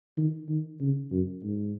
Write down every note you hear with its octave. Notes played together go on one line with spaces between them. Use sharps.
D#3
D#3
C#3
F#2
G#2